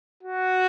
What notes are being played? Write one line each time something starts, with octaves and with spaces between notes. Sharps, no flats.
F#4